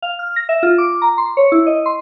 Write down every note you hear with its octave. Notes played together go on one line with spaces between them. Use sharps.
F5
F6
A#6
E5
F4
D6
A#5
C6
C#5
E4
D#5
C6